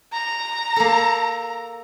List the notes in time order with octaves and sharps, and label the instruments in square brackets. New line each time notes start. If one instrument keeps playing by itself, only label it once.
[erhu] A#5
[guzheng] A#3 A4